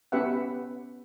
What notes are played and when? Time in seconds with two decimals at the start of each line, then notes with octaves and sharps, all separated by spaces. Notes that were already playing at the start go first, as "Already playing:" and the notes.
0.12 B3 C#4 G4 B4 E5 F#5